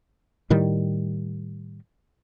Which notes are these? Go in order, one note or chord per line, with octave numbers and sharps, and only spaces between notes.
A2 D#3 G3